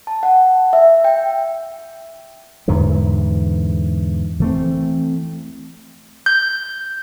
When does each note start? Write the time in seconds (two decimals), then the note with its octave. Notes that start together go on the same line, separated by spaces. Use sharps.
0.07 A5
0.23 F#5
0.73 E5
1.04 G5
2.68 E2 G#2 D3 E3
4.40 E3 A3 C4
6.26 G6